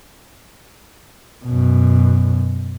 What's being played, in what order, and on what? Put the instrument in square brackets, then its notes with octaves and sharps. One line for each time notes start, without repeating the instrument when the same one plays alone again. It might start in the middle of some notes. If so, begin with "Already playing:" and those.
[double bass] F#2 B2